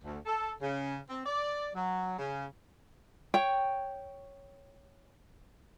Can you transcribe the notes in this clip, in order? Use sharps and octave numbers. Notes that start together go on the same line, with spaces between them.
D2
A4
C#3
C4
D5
F#3
C#3
C#5 G5